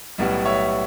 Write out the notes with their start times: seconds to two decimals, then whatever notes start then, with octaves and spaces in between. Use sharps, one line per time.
0.18 B1 A2 G3 B3
0.45 C#5 E5